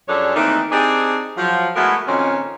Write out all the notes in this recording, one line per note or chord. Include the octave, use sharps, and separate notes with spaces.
F#2 F3 D4 G#4 A4 C#5
D#3 E3 A3 A#3 C4 D#4
C4 D4 D#4 G4 G#4
F3 F#3
G#3 A3 B3 E4 F#4 A#4
F2 A#2 D#3 C4 C#4